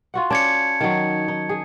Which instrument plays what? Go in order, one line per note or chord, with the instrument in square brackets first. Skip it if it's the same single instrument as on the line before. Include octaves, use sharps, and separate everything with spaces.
[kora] F4 F#4 F#5
[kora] C#4 C#5 D5 [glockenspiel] A5 G#6 C#7
[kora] D#3 F#3
D#4
G#4